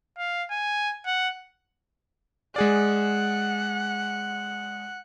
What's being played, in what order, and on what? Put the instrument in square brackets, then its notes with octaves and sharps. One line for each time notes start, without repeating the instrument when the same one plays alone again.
[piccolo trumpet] F5
G#5
F#5
[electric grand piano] G#3 G#4 D5 [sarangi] F#5